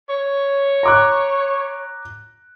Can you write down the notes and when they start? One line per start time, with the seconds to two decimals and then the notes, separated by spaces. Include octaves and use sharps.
0.09 C#5
0.83 A#5 D6 F#6